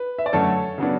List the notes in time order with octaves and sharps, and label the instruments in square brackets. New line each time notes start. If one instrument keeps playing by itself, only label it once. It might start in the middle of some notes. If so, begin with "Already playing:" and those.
Already playing: [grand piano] B4
E5
D5
F#2 D3 A3 A4 C#5
C#3 F#3 B3 D4